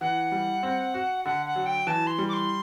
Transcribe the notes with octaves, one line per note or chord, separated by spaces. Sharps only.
E3 F#5
G3
C4
F#4
D3 F#5
F#5
F#3
G5
E3 A5
C6
G3
D6
C6